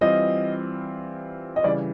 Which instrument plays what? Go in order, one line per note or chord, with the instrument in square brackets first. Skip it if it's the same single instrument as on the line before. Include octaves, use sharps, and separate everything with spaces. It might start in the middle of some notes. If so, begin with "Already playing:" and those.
[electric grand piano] E3 G3 C4 F4 [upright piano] D#5
[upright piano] D#5
[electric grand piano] C#3 E3 G3 [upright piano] D5